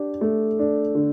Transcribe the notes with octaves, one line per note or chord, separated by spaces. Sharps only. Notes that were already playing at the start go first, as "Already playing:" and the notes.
Already playing: D4 G4
A3
D4
D3